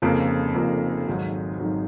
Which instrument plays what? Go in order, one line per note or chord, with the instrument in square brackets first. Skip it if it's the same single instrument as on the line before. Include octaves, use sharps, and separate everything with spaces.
[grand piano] F1 F2 C#3 F3 A#3
F1 F2 C#3 F3 A#3
G#1 G#2 D#3 F#3
G#1 G#2 D#3 F#3